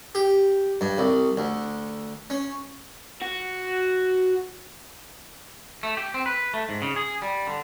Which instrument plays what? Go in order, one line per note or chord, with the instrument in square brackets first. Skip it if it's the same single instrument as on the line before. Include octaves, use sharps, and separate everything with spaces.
[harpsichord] G4
G2
C2
D2
C#4
[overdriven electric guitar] F#4
[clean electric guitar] A3
G4
C4
B4
A3
G#2
C#3
G#4
G3
D3